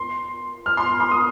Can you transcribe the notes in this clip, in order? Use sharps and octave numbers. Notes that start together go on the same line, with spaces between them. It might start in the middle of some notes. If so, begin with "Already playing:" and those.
Already playing: C6
F6
C6
C6
D#6